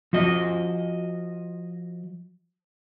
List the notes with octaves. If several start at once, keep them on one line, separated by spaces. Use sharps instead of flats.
F3 F#4 D#5